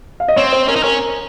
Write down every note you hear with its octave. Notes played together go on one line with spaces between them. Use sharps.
F5
D#5
C4 C#5
C5
C#4 A#4
D#4
C#4 A#4